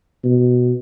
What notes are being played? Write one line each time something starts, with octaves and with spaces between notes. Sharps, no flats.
B2